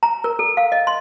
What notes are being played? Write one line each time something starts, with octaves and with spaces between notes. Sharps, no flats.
A#5
A#4
A4
F5
D#5
C6